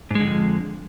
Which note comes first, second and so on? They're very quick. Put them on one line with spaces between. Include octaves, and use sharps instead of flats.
G#2 G#3 D3 F2